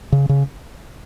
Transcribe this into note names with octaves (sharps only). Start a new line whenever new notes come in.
C#3
C#3